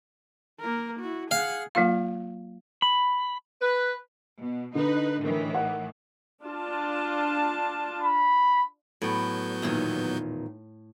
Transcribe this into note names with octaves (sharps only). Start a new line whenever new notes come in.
A#3 A#4
E4 F#4
G#4 F5 F#5
F#3 A#3 F4 F5
B5
B4
B2
D3 D#4 B4
A2 D#3 E3
F#5
D4 F4 A5
B5
A2 F#3 B3 G6
E2 A#2 D#3